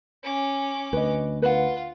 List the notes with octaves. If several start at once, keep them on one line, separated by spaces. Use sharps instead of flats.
C#4 D6
D2 B4 D#5
F4 B4 F#5